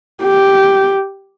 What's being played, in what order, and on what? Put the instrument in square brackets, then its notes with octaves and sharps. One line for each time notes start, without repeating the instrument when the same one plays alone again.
[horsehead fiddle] G4